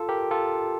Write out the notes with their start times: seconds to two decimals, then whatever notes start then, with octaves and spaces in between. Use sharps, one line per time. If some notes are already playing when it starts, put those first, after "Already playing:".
Already playing: F4 A4
0.09 G4 A#4
0.31 F4 A4